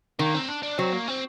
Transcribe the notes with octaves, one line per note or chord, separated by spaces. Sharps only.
D#3 A#3
C4
D4
D4
F#3 C4
A#3
C4